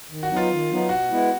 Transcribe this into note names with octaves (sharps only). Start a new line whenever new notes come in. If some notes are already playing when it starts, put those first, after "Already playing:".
D#3
F#4
F#3 B3 D#4
F4
D#3
F#3 B3 D#4
B2 F#4
G#3 B3 E4